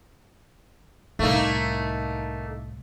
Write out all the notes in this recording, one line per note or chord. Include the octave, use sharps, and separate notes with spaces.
C2 A2 A3 A#3 D#4